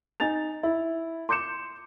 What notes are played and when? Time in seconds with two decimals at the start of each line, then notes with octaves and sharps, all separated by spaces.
0.20 D#4 G#5 A6 F7
0.63 E4
1.29 C6 D6 G6 C#7 E7